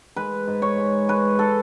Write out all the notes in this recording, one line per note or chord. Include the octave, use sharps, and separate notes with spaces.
G#3 B4
G#2
C#5
G#3
G#3 B4
A4